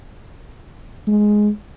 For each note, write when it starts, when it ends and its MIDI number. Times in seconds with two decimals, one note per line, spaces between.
1.07 1.49 56